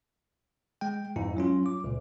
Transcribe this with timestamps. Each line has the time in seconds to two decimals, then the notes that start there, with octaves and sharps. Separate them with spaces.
0.81 G#3 G5
1.16 F2 G#2 E4
1.37 F#3 C#4 F4
1.66 D6
1.84 C#2 A#2